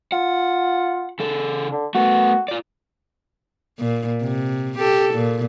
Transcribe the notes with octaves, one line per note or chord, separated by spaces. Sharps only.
F4 F#5
C#3 A4
D3
A3 B3 F#4
F4 D5
A#2
C3
G4 A4
A#2